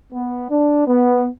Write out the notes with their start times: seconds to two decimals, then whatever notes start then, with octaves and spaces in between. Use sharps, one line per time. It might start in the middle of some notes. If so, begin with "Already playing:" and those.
0.12 B3
0.50 D4
0.87 B3